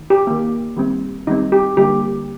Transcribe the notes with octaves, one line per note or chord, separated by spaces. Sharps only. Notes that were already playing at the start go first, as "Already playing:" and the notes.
Already playing: D#3
G4
D#3 A#3
D#3 G3 C4
D#3 G3 C4 D#4
G4
D3 G3 A#3 G4